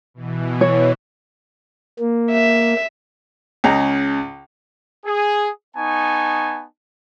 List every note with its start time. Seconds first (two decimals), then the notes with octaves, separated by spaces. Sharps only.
0.14 B2 E3
0.61 C#5
1.99 A#3
2.32 E5
3.64 C#2 C#3 G#4 D#5 A#5
5.05 G#4
5.75 B3 D#4 G#5 A5 C#6